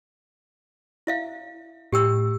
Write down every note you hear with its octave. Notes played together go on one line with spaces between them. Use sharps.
E4 E5 F5
A2 G4 G5 E6